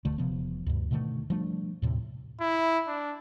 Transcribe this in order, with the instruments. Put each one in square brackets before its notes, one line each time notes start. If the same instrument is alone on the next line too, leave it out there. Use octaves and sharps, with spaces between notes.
[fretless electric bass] D#1 D2 D3 A3
E1 C3 F3 B3
D2 G2
B2 D3 D#3 A3
F3 G3 A3 D4
D#2 A2 C3
[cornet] E4
D4